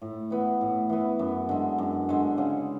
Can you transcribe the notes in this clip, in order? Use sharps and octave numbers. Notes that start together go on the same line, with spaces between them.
A2
E3 B3
A2
E3 B3
F#2
D3 G#3
F#2
D3 G#3
C#3